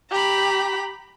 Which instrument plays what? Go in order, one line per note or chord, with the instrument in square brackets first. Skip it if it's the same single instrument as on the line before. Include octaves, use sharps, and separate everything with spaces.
[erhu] G4 [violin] A#5 B5